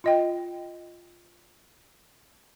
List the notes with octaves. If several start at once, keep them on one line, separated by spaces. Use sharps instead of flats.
F4 D#5 G5